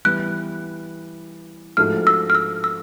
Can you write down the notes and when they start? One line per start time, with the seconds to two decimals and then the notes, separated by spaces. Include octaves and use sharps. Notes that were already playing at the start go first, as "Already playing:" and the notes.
0.05 E3 G3 B3 F#6
1.77 G#2 F3 A3 D4 F#4 F6
2.07 E6
2.30 F6
2.35 E6
2.64 E6